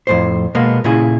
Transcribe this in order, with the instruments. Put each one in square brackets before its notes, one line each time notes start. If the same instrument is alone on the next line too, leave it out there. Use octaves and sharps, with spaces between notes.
[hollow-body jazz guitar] F2 A2 C5
B2 G#3 A#3 B3
A#2 C#3 E4 G#4